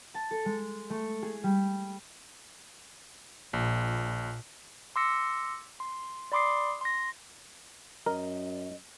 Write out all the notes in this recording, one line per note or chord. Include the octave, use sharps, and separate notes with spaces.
A5
A4
G#3
A3
G#4
G3
A#1 A#2
C6 D6 E6 A#6 C#7
C6
D5 B5 C6 D6 D#6 C7
C6 A#6
F#2 A#4 D#5